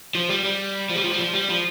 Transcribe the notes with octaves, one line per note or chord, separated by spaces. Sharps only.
F3
G3
G3
F3
G3
F3
G3
F3
G3
F3